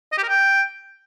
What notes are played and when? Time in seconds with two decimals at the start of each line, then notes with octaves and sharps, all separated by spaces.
0.13 D#5
0.18 G4
0.23 A#4
0.29 G5